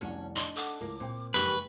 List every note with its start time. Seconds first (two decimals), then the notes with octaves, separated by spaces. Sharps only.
0.01 F1 C2 C#4 D4 F#4
0.36 D4 D#4 C6
0.56 A4 F#5 D6
0.81 C#2 A2 A#3
1.00 A#2 C4 G5
1.34 F#1 F2 G#3 A#3 D#4 G4 B4 C#6